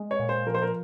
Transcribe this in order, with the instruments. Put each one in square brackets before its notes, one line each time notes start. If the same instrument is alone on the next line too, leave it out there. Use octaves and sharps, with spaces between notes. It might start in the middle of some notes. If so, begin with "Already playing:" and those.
Already playing: [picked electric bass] G#3
[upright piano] C#5
[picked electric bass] A#2
[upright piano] C5
[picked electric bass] F3 [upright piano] A#4
[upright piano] C5
A#4